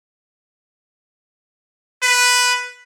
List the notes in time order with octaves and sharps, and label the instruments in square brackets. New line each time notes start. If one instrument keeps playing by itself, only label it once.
[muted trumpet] B4